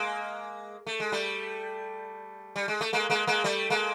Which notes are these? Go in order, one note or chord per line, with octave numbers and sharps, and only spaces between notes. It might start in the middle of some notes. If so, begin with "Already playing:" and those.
Already playing: G#3 A#3
A3
G#3
G3 A3
G3
G#3
A3
G#3 A#3
G#3 A#3
G#3 A#3
G3 A3
G#3 A#3